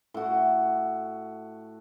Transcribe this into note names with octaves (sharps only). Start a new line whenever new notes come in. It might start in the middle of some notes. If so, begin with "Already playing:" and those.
A2 F#4